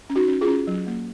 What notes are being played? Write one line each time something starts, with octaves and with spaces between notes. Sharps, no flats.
C#4
D#4 F#4
C#4
F4 G#4
C#4
F#3
A#3